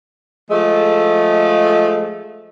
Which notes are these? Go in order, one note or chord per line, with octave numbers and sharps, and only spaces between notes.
F3 G#3 A3